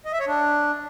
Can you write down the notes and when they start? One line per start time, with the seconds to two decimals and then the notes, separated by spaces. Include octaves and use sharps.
0.05 D#5
0.12 E5
0.20 C#5
0.27 D4